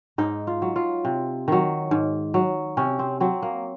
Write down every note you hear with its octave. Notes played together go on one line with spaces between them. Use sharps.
G#2 D#4
F4
F#3
F4
C3
D#3 F#3
G#2
F#3
C3 C#4
C4
F#3 C4
A#3